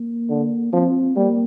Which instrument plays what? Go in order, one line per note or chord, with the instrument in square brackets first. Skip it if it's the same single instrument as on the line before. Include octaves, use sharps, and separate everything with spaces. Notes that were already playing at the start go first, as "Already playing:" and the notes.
Already playing: [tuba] A#3
[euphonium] D3
[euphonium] F3 [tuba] C4
[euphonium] G3 [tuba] A#3